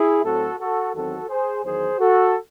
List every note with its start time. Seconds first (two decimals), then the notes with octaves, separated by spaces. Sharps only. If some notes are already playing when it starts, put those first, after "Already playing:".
Already playing: E4 G#4
0.24 A2 F#3 C4 F#4 A4
0.59 F#4 A4
0.94 E2 D#3 F#3 C4 F#4 A4
1.29 G#4 C5
1.64 E2 D#3 F#3 G#4 C5
1.99 F#4 A4